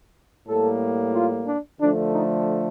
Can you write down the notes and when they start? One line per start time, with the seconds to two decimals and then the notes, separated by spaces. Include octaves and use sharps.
0.48 A2 G3 A#3 A4
1.15 F4
1.47 D4
1.80 D3 F3 A3 D4
2.13 D#4